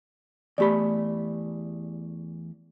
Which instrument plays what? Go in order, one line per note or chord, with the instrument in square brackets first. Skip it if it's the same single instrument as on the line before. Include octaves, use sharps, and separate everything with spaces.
[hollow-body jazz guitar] E2 A3 B5 [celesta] G4 D5